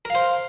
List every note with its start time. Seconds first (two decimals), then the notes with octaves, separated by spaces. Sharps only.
0.05 A#4
0.10 F5
0.15 C5